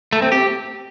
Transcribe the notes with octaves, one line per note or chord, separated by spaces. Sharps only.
A3
C4
G4